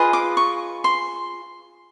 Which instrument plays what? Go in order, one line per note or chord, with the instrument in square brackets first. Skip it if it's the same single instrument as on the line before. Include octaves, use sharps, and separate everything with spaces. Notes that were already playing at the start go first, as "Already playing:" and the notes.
Already playing: [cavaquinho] F4 G#4 B4 D#5
D6
C#6
C6